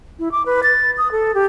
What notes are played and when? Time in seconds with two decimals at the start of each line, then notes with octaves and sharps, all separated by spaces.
0.19 E4
0.32 D6
0.46 B4
0.63 A6
0.98 D#6
1.12 A4
1.35 G4